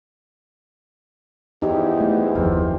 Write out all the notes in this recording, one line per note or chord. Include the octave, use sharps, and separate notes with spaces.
E2 E3 F3 D#4 E4 G4
A3
F#1 D#2 F3 A#3 C4 F4